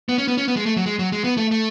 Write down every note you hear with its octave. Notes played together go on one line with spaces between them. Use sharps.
B3
C#4
B3
C#4
B3
G#3
A3
F#3
G#3
F#3
G#3
B3
A3
A3